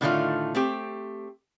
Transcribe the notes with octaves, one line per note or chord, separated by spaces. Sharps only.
A2 D3 D#3 A3 C#4 F4
A3 C4 G4